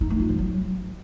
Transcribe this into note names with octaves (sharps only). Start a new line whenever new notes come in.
D#4
A3
F4
F3
F#3